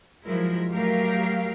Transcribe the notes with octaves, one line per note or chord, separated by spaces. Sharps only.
F3 F#3 G#3 E4 A#4
F#3 A3 G4 A#4 F5